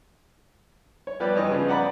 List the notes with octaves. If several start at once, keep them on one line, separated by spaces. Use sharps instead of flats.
C#5
F3 G3 B3 G4 B4 D5
G2 E3 D#5
C#3 F3 B3
D5 F#5 A#5 B5